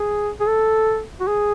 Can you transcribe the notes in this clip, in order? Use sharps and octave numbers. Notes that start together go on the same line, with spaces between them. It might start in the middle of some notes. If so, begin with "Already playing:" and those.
Already playing: G#4
G#4
A4
F#4
G#4